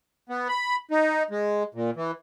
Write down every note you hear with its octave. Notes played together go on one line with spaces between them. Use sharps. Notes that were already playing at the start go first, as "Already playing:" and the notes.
B3
B5
D#4
G#3
A#2
E3